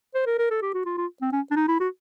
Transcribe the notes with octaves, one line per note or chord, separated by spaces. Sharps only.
C5
A#4
A#4
A4
G4
F#4
F4
F4
C4
C#4
D4
D#4
E4
F#4